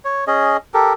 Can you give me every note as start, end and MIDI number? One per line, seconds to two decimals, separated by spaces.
0.05 0.25 73
0.27 0.57 61
0.27 0.57 68
0.27 0.57 75
0.74 0.93 67
0.74 0.93 69
0.74 0.93 70